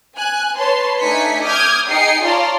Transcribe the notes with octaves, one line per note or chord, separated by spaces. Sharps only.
G#5 F#6
B4 C#5 A5 C6
A3 D4 D#4 G#5 B6 C#7
D6 D#6 F6 G6 G#6
D#4 G#4 G5 D#6 C7 C#7
F4 C#5 D5 A5 A#5 C6